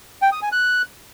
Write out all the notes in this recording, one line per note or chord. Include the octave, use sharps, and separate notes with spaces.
G5
D#6
G#5
F#6